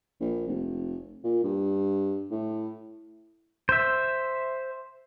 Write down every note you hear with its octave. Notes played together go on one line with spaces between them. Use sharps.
A#1
F1
A#2
G2
A2
C5 E5